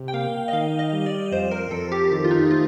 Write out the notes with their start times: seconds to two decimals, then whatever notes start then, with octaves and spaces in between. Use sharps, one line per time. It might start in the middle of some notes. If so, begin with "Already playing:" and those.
Already playing: C3
0.08 G5
0.13 A#3 F5
0.48 D#5
0.53 D#3 F5
0.79 D#5
0.93 G3
1.06 D5
1.32 F2 C5
1.51 A#4
1.71 F2 A4
1.92 G4
2.11 D#3 G4
2.24 F4
2.31 D#4
2.50 A3 F4